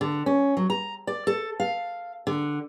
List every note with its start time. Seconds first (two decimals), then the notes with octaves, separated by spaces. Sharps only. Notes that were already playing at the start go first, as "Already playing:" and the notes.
0.01 D3
0.26 C#4
0.57 F#3
0.70 A#5
1.07 D5
1.27 A4
1.60 F5
2.27 D3